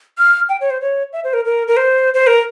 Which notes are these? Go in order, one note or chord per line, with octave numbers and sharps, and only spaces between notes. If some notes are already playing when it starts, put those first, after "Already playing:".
F6
G5
C#5
C5
C#5
E5
C5
A#4
A#4
A#4
C5
C5
A#4